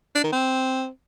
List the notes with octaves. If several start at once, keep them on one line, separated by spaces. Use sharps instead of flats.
D4
D#3
C4